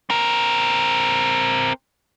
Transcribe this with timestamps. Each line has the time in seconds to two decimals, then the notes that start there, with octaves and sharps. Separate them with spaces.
0.10 C4 A#4